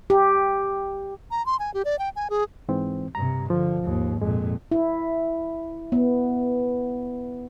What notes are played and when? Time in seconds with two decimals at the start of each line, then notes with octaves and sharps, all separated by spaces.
0.10 G4
1.31 A#5
1.46 C6
1.59 G#5
1.74 G4
1.85 D5
1.99 G5
2.16 G#5
2.30 G#4
2.69 G#2 E3 C4
3.15 G2 C3 A#5
3.50 D3 F3
3.84 D#2 G#2
4.22 F2 A#2 G#3
4.71 E4
5.92 B3